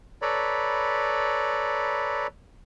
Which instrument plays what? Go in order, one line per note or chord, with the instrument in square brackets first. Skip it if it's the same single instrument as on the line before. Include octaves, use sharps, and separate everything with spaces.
[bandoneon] A4 B4 C#5 D5 A#5 B5